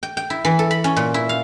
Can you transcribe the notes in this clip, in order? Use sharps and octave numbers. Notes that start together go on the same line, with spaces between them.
G5
G5
E4
E3
A4
B5
C#4
A#2
E4
F5